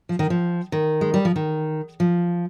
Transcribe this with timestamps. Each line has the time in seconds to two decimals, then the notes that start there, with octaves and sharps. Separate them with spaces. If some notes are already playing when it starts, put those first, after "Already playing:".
0.09 F3
0.19 D#3
0.30 F3
0.72 D#3
1.01 G#3
1.14 G3
1.25 F3
1.36 D#3
2.00 F3